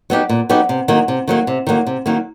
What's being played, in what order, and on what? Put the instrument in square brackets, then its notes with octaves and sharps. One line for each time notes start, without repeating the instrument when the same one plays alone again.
[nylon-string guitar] F#3 B3 D#4 G4
A#2
F#3 B3 D#4 G4
C3
D#3 F#3 A#3
C3
D#3 F#3 A#3
C3
D#3 F#3 A#3
C3
D#3 F#3 A#3